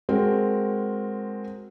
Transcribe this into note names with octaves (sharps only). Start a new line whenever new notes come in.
G#3 C4 F#4 A#4